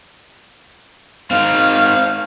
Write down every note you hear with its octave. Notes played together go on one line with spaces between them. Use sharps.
C4 D#4 F5